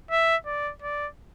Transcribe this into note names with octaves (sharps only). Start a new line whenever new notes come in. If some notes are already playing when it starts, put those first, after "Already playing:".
E5
D5
D5